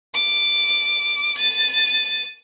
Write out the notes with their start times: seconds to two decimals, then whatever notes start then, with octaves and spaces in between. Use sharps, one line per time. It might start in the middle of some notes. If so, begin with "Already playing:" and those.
0.14 D6
1.38 A6 D#7